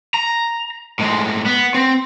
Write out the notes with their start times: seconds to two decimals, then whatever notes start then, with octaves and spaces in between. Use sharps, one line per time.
0.14 A#5
0.99 A2 G#3
1.46 B3
1.74 C4